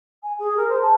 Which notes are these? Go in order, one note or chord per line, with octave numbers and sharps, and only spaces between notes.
G#5
G#4
A#4
C5
A5